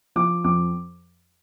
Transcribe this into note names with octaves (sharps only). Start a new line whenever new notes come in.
F3 D6
F2 D6